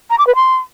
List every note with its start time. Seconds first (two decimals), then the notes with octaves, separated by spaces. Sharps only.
0.10 A#5
0.19 D6
0.27 B4
0.35 C6